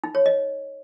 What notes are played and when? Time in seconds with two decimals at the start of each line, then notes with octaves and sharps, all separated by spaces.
0.04 D#4
0.15 C#5
0.26 D#5